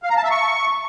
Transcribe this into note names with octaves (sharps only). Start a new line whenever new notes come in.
F5
A#5
A5
E5
C#6